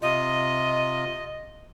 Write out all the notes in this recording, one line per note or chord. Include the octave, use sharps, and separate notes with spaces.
C3 F4 D#5